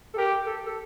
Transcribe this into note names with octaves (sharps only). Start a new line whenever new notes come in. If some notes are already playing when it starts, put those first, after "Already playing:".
A4
G4 A#4
A4
A4